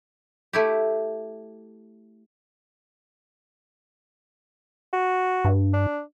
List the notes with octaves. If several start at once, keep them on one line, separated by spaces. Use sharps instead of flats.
A3 E4 G4
F#4
G2
D4